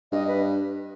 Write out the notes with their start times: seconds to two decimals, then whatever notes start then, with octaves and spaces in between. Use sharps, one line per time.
0.12 G2 D#5
0.27 B4